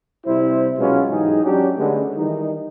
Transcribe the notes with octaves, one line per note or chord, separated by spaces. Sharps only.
C3 G3 E4 C5
B2 F#3 G#3 B3 C#4 F4
G#2 E3 F#3 D#4 G4 G#4
F#3 C#4 D4 G4
D3 G#3 A3 B3 C#4
D#3 E3 G3 D#4